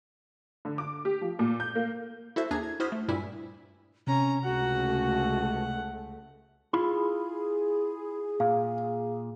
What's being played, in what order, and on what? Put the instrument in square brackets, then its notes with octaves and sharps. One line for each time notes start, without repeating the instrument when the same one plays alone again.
[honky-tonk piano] D3
D6
G4
F3
A#2
G6
A#3
[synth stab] E4 F#4 A4 C5 E5
D#2 D4 G#4 G#5 A#5 G#6
G#6
E4 F#4 C5 D#6 F6 B6
A3
G2 A#2 G3 E4 G#5 B6
[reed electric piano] C3 [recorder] C#4 [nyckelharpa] A#5
[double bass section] C#2 A3 [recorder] F#4 [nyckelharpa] F#5
[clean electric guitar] E4 F5 B5 [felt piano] F4 [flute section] G#4
[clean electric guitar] A#2 [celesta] F5